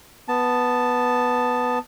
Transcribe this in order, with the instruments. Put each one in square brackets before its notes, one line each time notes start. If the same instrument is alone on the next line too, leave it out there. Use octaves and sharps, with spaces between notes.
[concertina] B3 A5